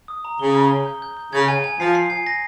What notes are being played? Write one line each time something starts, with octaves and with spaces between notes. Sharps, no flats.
D#6
A#5
C#3 G7
G6
G7
G6
G6
G6
C#3 G#6
G#5
G#5
F3 C7
C7
G#5
A#6